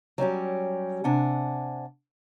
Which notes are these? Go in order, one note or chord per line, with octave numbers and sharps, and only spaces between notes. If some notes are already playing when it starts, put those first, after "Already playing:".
F#3 G3 C#4 G4
C3 D4 F#5 G#5